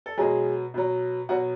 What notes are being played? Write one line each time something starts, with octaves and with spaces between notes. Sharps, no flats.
A4
B2 F#3 G#3 G#4
B2 F#3
B2 F#3 F#4